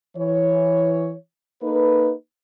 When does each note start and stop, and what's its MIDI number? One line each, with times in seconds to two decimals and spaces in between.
0.16 1.15 52
0.16 1.15 73
1.62 2.11 58
1.62 2.11 63
1.62 2.11 69
1.62 2.11 71